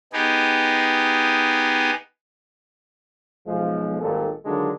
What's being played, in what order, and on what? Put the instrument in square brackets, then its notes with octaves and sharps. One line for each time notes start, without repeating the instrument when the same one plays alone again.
[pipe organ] B3 D#4 G4 G#4
[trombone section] B1 F3 G#3
G#1 A#2 D#3 G3 A4
D3 D#3 F#3 G#3 D4 F4